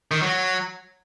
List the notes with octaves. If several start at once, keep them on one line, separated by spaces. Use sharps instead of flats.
D#3
F#3